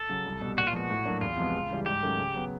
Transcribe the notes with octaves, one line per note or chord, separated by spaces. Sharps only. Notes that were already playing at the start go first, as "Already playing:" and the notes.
Already playing: A4
C#3 F#3
C2
B2 G3
A#2 F#4
F4
F3 G#3 B3 F#4
A2
F#3 A#3 D4
E2 F4
C3 F3 G#3 B3
C#2
C#3 E3 G3
G#2 G4
D#3 F#3 A3 C#4
C#3
F#3 B3